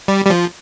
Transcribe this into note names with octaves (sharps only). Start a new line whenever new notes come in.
G3
G3
F3